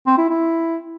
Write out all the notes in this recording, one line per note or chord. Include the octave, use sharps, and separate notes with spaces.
C4
E4
E4